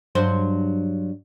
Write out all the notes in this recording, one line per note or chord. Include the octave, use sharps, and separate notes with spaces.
G2 F#3 C5